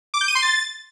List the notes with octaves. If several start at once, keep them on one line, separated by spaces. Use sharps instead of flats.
D6
G6
D#7
C6
A6